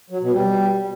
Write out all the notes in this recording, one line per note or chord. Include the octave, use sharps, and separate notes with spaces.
F#3
B2
G3